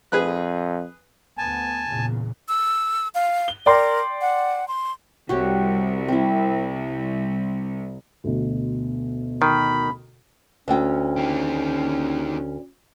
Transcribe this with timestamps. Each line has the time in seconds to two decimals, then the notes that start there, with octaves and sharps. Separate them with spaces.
0.12 F2 G#4 B4 F#6
1.38 D2 B3 G#5 A5
1.88 E2 A#2 C#3
2.49 E6
3.15 F5
3.48 G7
3.66 A#4 D5 G5 C6
4.21 F#5
4.68 C6
5.29 C2 F#4 G4 C#5
6.08 C4 E4
8.24 D2 B2
9.42 D#3 B5
10.68 D2 C#4 G5
11.17 D#3 G4